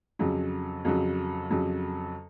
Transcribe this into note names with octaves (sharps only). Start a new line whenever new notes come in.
F2 C#3 F#3
F2 C#3 F#3
F2 C#3 F#3